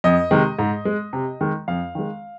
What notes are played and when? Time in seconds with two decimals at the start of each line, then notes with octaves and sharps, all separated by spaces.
0.04 F2 D#5
0.31 C3 D#3 G#3
0.59 G#2
0.85 G#3
1.13 C3
1.41 D#3 G#3
1.68 F2 F5
1.95 D#3 G#3